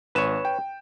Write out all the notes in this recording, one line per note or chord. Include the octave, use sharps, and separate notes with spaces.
G#1 B4 C#5 E7
G5